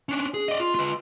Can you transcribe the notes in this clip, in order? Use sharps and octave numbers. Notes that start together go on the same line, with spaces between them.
C#4 D4
G#4
D5 D#5
F4
F4 B4